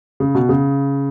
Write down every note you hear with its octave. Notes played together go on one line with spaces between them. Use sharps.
C#3
B2
C#3